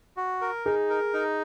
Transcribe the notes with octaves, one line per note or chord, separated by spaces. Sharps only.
F#4
A#4
D#4 G#4
A#4
D#4